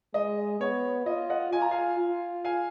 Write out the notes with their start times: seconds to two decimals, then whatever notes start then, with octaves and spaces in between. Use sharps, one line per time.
0.14 G#3 D#5
0.60 B3 C#5
1.06 F4 D#5
1.30 D#5 F#5
1.52 F4 G#5
1.62 A#5
1.71 F5 G#5
1.99 F4
2.45 F5 G#5